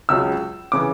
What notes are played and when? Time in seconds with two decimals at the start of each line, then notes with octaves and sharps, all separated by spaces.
0.09 C#2 C#3 F#3 E6
0.72 C#3 E3 D6